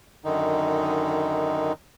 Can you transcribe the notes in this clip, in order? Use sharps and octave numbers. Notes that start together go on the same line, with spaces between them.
F#2 D3 D#3 D#4